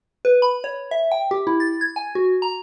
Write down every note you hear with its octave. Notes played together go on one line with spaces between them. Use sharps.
B4
B5
C#5
E5
G5
G4
E4
A6
G#6
G#5
F#4
A#5